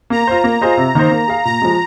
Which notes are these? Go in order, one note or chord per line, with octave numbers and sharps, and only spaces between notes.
A#3 A#5
F4 C5
A#3
F4 G#4 C5 D#5
C3
D#3 A#3 D#4 C5
A#3
G#4 F5
A#2 A#5
F3 G#3